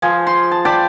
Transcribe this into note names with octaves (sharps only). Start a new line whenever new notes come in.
F3 G#4
C6
A5
D5 G5 A5 B5